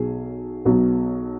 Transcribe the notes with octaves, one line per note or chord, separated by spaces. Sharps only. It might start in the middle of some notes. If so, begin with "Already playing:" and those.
Already playing: B1 B2 F#3 G#4
B1 B2 F#3